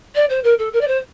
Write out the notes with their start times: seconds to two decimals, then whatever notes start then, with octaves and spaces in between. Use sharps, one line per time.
0.15 D5
0.30 C5
0.44 A#4
0.59 A4
0.73 A#4
0.81 D5
0.88 C5